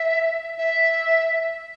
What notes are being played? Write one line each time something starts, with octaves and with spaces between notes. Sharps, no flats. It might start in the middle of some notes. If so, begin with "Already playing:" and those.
Already playing: E5
E5